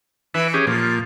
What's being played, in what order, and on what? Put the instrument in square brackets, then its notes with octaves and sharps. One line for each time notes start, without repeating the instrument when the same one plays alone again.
[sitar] E3 [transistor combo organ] B4 E5
[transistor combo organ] C#4 G4 G#4
[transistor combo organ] A#2 [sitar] F3